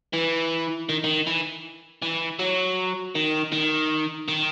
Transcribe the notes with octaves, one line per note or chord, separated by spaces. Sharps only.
E3
D#3
D#3
E3
E3
F#3
D#3
D#3
D#3